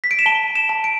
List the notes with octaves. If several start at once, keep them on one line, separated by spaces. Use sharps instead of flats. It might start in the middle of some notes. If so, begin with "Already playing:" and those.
B6
D7
E7
A5 G7
E7
A5
D7